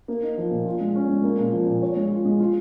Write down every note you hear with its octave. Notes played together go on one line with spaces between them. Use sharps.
A#3
D#4
F3
A#2
F4
G#3
C#4
G#3
A#3
A#2
F3
A#2
C#5
G#3
F4
G#3
F4